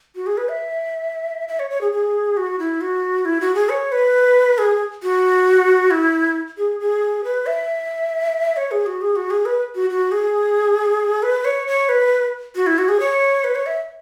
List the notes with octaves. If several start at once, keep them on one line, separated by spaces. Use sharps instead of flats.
F#4
G#4
B4
E5
E5
C#5
C#5
G#4
G#4
F#4
E4
F#4
E4
F#4
G#4
C#5
B4
G#4
F#4
E4
G#4
G#4
B4
E5
C#5
G#4
F#4
G#4
F#4
G#4
B4
F#4
F#4
G#4
B4
C#5
C#5
B4
F#4
E4
F#4
G#4
C#5
B4
C#5
E5